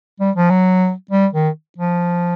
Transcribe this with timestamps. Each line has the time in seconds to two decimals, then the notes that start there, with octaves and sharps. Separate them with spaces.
0.20 G3
0.36 F3
0.50 F#3
1.11 G3
1.33 D#3
1.78 F3